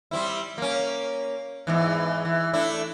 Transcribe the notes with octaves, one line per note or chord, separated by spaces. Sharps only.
G3 C4 E4
A#3 C#4
E2 G#2 E3
E3
A3 D4 E4